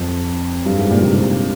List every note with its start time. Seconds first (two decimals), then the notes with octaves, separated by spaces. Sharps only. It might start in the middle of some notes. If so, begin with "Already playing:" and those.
Already playing: F2
0.66 G2
0.78 G#2
0.90 A#2
1.03 C3
1.15 C3